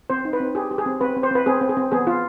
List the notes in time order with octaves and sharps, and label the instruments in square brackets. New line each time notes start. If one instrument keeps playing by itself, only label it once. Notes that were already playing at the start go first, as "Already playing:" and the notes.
[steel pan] C4 C5
D#4
B4
C4
G4 G#4
G4
G#4
C4
C4 B4
C4
C5
C4 B4
C4 G#4
C4
G#4
C4
B3 G#4
F4